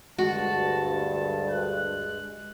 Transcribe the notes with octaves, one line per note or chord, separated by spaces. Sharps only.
D2 G2 G#3 F#4 A5
F#6